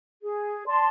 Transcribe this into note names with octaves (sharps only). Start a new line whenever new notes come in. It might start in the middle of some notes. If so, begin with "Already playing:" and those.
G#4
D5 A5 C6